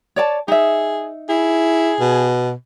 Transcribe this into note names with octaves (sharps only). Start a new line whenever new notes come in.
C#5 D5 A5
D#4 G#4 E5
E4 G#4
B2